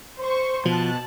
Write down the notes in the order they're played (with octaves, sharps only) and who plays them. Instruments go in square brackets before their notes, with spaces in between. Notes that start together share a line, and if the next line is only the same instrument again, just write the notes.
[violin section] C5 C#6
[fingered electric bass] B2 [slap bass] F3 [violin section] A5 F#6